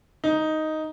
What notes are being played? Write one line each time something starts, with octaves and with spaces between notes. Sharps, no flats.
D#4